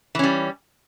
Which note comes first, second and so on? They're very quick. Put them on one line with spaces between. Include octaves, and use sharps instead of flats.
E3 C#4 G3